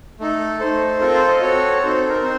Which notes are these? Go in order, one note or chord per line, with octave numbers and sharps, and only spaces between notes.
A3 D#4 A4
A3 D#4 A4 C5
C4 F4 A4 A#4
C5
D#5
C4 F#4 A4 C#5
C4 D#4 A4 C5
A4
A#4
C4 C5